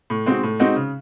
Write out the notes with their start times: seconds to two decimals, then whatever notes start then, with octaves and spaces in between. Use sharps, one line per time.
0.10 A2
0.26 G#3 C4 D#4 F#4
0.43 A2
0.60 G#3 C4 D#4 F#4
0.76 C#3